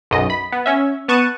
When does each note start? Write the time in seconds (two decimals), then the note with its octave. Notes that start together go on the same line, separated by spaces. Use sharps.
0.11 B1 F#2 D#5
0.30 B5
0.52 B3
0.66 C#4 E5
1.08 B3 A5 C#6 F#6 C#7 D#7